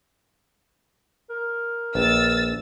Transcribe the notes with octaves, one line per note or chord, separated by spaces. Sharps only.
A#4
A#1 B4 E6 A6